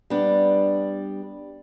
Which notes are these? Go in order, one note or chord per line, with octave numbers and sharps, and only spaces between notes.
G3 B3 D4